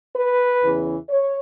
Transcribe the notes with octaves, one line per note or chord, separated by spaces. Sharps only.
B4
E2 C#3 E3
C#5